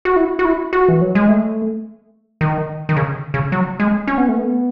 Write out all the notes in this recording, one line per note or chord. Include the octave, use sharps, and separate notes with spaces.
F#4
E4
F#4
E4
F#4
E3
F#3
G#3
A3
D#3
D#3
C#3
C#3
F#3
G#3
C#4
B3
A3
B3